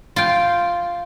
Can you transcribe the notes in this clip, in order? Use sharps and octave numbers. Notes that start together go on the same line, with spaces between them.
F4 G5